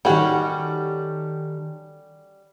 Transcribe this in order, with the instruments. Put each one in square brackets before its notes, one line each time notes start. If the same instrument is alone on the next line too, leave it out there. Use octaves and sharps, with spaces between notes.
[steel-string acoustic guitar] D#3 G4 A4 [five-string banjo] G3 C#4 F#4